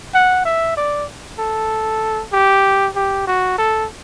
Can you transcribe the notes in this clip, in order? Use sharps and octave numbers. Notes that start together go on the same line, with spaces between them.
F#5
E5
D5
A4
G4
G4
F#4
A4